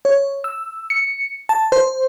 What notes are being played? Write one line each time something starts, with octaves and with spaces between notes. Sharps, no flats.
C#5
E6
C#7
A5
C5